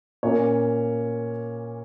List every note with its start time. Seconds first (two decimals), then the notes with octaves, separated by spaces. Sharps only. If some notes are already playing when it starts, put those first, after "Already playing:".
0.23 A#2 A#3 C#4 C#5